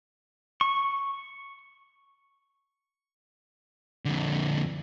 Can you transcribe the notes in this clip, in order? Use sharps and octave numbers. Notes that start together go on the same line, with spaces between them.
C#6
F2 D3